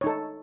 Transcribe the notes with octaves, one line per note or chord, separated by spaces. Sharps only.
D#4 A4 C#5